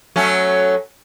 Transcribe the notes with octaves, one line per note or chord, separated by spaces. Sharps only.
F#3 A3 C#4